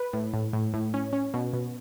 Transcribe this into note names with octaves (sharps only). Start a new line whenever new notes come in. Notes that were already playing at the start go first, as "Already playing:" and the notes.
Already playing: B4
A2
A2
A2
A2
C#4
C#4
B2
B2